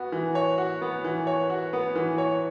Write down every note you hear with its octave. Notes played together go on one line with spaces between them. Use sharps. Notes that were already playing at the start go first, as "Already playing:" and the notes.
Already playing: B3 F#4
E3
C#5
F#4
B3
E3
C#5
F#4
B3
E3
C#5